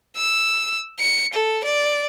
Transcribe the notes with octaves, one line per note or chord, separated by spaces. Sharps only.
E6
C#7
A4
D5